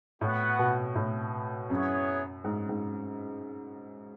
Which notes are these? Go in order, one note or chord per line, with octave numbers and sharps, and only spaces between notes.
A2 B3 F#4 B4 F#5
B2
A2
F#2 B3 E4 G#4 C#5 F#5
G#2
G#2